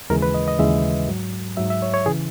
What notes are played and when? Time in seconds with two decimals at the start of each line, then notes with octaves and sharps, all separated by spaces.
0.10 D#2 C#3 E3 G#3 A#4
0.22 B4
0.34 D#5
0.48 D#5
0.59 D#2 C#3 E3 G#3 E5
1.08 G#2 F#3
1.57 G#2 F#3 E5
1.70 E5
1.82 C#5
1.94 C#5
2.06 C#3 E3 G#4